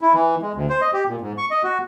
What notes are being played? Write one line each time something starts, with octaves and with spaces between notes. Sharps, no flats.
E4
E3
G#3
D2
C5
D#5
G4
A#2
G#2
C#6
D#5
F#4